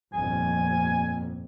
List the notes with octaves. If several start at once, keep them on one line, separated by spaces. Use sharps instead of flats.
G1 F2 A#2 G#5